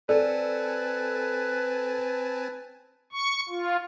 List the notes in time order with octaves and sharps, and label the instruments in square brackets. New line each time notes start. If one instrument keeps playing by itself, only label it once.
[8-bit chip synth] C4 G#5 A5 [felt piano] A4 [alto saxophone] B4 [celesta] D5
[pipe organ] C#6
F4